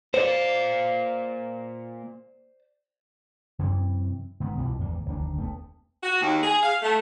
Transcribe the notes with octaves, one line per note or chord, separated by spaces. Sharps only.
A#2 C5 D5 F5
F#2 C3 E3 C4
G#2 D#3 B3
C2 B2 E3 F3
G#1 E2 A#3
F1 D2 D#3 D4
D#1 A3 B3
F#4
D#2
G#4
F5
A3